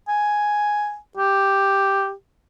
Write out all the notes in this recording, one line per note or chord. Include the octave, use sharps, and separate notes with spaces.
G#5
G4